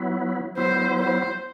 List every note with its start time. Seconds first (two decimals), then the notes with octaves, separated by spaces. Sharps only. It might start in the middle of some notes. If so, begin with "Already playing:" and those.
Already playing: F#3 B3 E4
0.57 F#3 B3 E4 C5
0.99 C5